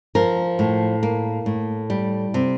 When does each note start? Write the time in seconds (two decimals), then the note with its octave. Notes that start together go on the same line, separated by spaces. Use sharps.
0.15 F3 A#4
0.59 A2
1.03 A#3
1.46 A2
1.90 G3
2.34 C3